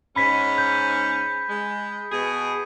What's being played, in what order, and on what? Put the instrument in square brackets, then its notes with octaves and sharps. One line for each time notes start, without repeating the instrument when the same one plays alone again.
[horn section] G#2 C#4 [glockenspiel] B5 B6
[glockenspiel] G6
[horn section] G#3
B2 G#4